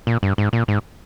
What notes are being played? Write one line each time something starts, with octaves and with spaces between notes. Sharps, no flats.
A#2
G2
G#2
A#2
G#2